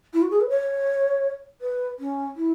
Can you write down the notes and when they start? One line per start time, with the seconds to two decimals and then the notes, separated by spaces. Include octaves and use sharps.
0.13 E4
0.22 F#4
0.31 G#4
0.41 B4
0.49 C#5
1.61 B4
1.99 C#4
2.36 E4